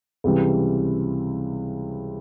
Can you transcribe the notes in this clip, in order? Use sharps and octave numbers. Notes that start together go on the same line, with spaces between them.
C#2 C3 E3 G3